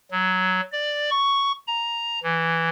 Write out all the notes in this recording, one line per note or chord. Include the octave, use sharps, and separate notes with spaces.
F#3
D5
C#6
A#5
E3